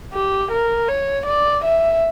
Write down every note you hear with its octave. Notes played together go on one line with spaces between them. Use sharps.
G4
A#4
C#5
D5
E5